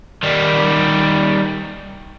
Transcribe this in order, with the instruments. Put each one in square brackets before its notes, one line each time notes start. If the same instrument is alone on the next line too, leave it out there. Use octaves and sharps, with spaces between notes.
[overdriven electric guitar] D#3 G3